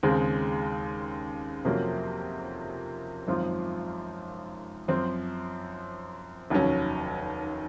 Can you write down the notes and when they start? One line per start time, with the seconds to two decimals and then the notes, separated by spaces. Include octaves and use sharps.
0.03 D#2 C#3 G#3 C4
1.65 F2 C3 F#3 A#3 C#4
3.27 G#1 F#2 F3 C4 F4
4.88 F#2 F3 C4
6.50 F1 D#2 D#3 F#3 C#4